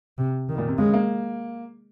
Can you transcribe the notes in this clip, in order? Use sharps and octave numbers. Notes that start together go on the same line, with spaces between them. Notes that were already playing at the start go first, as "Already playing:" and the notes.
C3
D#3
A#2
C3
C#3 G#3
A#3